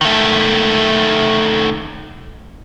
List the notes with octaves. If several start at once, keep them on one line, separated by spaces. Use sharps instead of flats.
D#3 A3